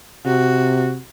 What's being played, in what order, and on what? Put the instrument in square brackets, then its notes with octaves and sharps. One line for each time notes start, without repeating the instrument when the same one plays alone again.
[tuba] C3 [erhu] F#4